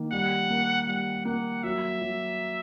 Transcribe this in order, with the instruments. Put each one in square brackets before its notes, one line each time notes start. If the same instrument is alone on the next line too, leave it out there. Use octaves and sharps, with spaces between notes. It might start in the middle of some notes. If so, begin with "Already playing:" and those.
Already playing: [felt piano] D#3 A#3
[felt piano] G3 [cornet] F#5
[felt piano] A#3
[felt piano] G3 [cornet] F#5
[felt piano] A#3 [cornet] F#5
[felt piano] F#3 [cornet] E5
[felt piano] F#3